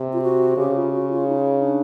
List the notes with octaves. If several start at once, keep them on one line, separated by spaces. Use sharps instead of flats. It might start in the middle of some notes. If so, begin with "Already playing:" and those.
Already playing: C3
F4
F#4
C#3 G4
F4
F#4
F4
D#4
D4